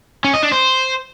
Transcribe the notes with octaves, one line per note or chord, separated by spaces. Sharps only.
C#4
D#5
D4
C5